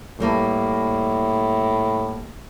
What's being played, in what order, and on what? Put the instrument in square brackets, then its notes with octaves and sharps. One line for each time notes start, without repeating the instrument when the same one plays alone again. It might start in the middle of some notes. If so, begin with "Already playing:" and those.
[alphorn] A2 [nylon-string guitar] G3 A#3 B4